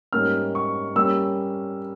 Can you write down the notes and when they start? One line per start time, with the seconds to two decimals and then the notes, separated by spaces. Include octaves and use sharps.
0.13 G#2 G3 A#3 C#4 F6
0.55 C#6
0.96 G3 A#3 C#4 E6